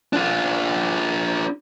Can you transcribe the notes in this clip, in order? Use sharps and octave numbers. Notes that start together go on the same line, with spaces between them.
D4 F4